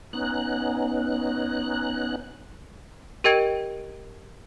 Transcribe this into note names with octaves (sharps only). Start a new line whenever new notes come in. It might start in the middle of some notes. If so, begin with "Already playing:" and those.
B3 C#4 D#4 F#6
G4 A#4 D#5 G5 G#6 D7